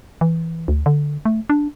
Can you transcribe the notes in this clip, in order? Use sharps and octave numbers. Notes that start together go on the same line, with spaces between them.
E3
D2
D3
A3
D4